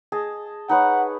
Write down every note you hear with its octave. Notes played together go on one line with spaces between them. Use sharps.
G#4 D#5 A5
D#4 B4 C#5 F#5